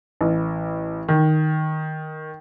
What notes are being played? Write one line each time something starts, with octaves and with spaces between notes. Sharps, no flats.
A1
D#3